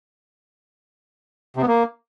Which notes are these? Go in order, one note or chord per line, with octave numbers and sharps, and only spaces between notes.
C3
B3
A#3